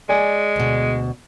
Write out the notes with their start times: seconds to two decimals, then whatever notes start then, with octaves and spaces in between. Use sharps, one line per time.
0.09 G#3 D5 G#5
0.56 D2 B2